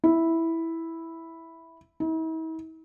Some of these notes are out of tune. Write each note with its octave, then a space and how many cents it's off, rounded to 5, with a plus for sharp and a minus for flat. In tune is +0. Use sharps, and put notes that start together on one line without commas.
E4 -5
E4 -45